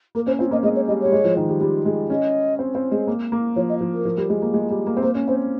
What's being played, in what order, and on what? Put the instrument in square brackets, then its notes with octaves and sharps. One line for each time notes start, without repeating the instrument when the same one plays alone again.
[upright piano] A#3 [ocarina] A#4
[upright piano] C#4 [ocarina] C5
[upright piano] C4 [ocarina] F4
[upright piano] A#3 [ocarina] D#5
[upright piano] G#3 [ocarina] D#5
[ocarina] C#5
[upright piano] G3 [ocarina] D#5
[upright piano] G3 [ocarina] C#5
[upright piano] G#3
F3
D#3
G3
G3
G#3
[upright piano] C#4 [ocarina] D#5
[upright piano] C4
C4
G#3
A#3
A#3
[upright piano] F3 [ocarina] C#5
[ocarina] D#5
[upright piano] F3
[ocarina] A#4
[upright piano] F3
G3
G#3
A#3
G#3
G3
A#3
C4
[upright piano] A#3 [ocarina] C5
[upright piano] C#4
[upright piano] C4 [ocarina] C5